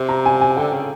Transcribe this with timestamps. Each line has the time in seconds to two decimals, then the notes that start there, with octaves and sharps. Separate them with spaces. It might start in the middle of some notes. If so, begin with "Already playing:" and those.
Already playing: C3
0.09 A#5
0.26 G#5
0.41 G#5
0.57 D3 G5
0.73 C#3